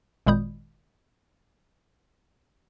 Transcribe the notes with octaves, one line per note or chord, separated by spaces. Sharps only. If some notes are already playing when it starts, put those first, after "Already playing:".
G#1 A#2 G#3 B5 D#6 G6